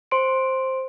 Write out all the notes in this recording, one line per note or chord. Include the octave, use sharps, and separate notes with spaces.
C5 C6 D7